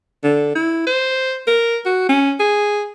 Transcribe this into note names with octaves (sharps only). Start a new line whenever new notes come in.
D3
E4
C5
A#4
F#4
C#4
G#4